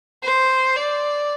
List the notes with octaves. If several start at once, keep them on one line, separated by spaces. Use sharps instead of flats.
C5
D5